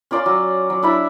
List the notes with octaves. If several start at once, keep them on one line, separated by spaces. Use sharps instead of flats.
C#4 F4 D5 C6
F#3
F#3
D4 E4 B5